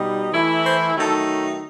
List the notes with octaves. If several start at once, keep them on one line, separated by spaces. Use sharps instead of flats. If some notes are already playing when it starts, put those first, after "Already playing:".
Already playing: B2 G3 D#4
E3 A3 E4
C5
D#3 F#3 A3 D#4 A4